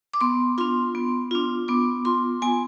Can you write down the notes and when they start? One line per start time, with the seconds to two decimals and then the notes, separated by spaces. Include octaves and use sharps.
0.14 D6
0.21 B3 C6
0.58 D4 F4 C6
0.95 B3
1.31 D4 F4
1.68 B3 D6
2.05 F4 C6
2.42 B3 G#5